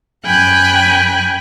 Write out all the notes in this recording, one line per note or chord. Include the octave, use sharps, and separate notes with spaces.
F#2 G5 G#5 B5 F#6